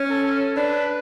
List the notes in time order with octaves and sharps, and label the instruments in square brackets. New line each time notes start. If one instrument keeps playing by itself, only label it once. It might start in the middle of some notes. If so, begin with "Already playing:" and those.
Already playing: [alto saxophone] C#4
[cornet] A4
[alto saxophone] D4 [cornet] B4